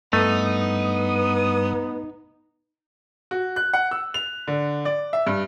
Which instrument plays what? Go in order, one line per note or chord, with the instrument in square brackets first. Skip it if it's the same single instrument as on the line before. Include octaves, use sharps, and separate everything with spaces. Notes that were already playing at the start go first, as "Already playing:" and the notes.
[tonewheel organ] G2 D#6 [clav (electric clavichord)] A3 [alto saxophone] B3 [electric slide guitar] D#4
[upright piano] F#4
F#6
F#5
E6
F7
D3
D5
E5
G2